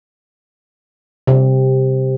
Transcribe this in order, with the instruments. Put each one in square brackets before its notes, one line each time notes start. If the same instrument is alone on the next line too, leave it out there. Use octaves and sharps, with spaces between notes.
[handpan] C3